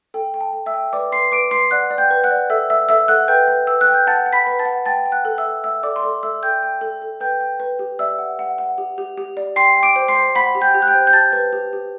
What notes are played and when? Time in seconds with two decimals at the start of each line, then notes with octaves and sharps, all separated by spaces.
0.14 A4 G5
0.34 G5
0.41 A5
0.53 A4
0.66 E5 E6
0.74 G5
0.93 B4 D5 D6
1.12 B4 C6 C7
1.32 B4 D6 D7
1.51 B4 C6 C7
1.71 D5 F#5 F#6
1.90 D5
1.98 G5 G6
2.11 B4
2.24 F#5 F#6
2.31 D5
2.50 A4 E5 E6
2.70 E5 E6
2.89 A4 E5 E6
3.08 A4 F#5 F#6
3.28 B4 G5 G6
3.48 B4
3.67 B4 E6
3.81 F#6
3.87 G5
3.94 G6
4.07 F#5 A5 A6
4.26 F#5
4.33 B5 B6
4.47 B4
4.59 A5 A6
4.65 F#5
4.86 G5 A5 A6
5.06 G5
5.12 F#5 F#6
5.25 A4
5.38 E5 E6
5.44 A4
5.64 E5 E6
5.83 A4 D5 D6
5.96 C6
6.03 A4 D5 D6
6.23 A4 E5 E6
6.42 A4 G5 G6
6.63 G5
6.81 A4
7.02 A4
7.20 B4 G5 G6
7.41 G5
7.60 B4
7.79 G4
7.99 D5 E5 E6
8.19 F#5
8.39 F#5
8.58 F#5
8.78 G4
8.98 G4
9.18 G4
9.37 D5
9.56 G5 C6 C7
9.77 G5
9.83 D6 D7
9.96 C5
10.08 C6 C7
10.15 C5
10.35 F#5 B5 B6
10.55 G4
10.61 G5 G6
10.74 G4
10.82 F#6
10.87 G5 G6
10.95 C5
11.07 G6
11.13 G4 A5 A6
11.33 B4
11.53 G4
11.73 G4